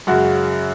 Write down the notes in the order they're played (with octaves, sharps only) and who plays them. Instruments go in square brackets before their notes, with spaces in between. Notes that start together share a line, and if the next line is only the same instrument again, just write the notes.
[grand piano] F#2 C#3 G#3 F#4